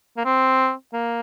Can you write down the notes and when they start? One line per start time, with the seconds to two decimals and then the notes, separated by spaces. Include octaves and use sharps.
0.17 A#3
0.25 C4
0.93 A#3